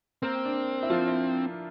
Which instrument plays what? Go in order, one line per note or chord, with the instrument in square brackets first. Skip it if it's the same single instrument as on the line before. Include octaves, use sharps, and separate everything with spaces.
[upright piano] A#3 A#4 [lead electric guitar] C4
[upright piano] D4
E4
F3 F4
E4